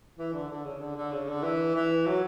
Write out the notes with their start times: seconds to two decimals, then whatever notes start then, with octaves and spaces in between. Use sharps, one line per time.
0.17 E3
0.33 D3
0.49 D3
0.65 C#3
0.80 D3
0.97 D3
1.12 C#3
1.28 D3
1.43 E3
1.75 E3
2.06 F#3